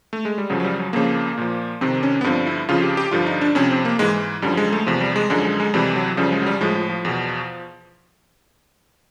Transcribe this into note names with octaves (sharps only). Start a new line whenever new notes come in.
A3
G#3
G3
F#2 C#3 F3 F#3
F#3
G3
F#3
F2 C#3 F3 A#3
A#2 F3
F2 C3 D#3 C4
C#4
B3
G2 D3 F3 C4
E4
F2 C#3 F3 F4
G4
G4
G2 D3 F3 F4
D#4
D4
F2 C3 F3 C#4
C4
A#3
G#2 E3 G#3
F#2 D3 F3 G3
G#3
A3
E2 C3 F3
G3
G#3
F#2 D3 F3 G#3
G#3
G#3
F2 C3 E3 G3
F#3
F#2 C#3 F3 G3
G#3
F#3
G3
A2 F3 G#3
F3
F3
E2 B2